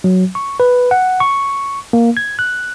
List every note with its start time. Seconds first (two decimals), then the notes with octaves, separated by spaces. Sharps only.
0.04 F#3
0.35 C#6
0.60 B4
0.91 F#5
1.20 C#6
1.93 A#3
2.17 G#6
2.39 F#6